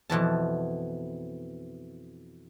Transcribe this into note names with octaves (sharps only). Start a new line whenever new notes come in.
F2 B2 E3 A5